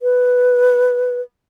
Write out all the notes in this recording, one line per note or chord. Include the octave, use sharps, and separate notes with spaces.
B4